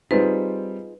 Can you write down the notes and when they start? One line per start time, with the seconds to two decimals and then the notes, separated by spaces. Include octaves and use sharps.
0.11 G3 C4 D#4 F4 G#4 B4 C5